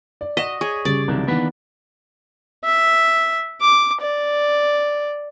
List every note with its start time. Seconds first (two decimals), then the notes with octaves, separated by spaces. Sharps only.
0.21 D5
0.37 F#4 D#5 B6 E7
0.61 G#4 C#5
0.85 C#3 G3 D5
1.08 C2 D#3 F3 F#3 D4
1.27 D#3 E3 A#3 B3 D4 B4
2.64 E5
3.61 D6
4.02 D5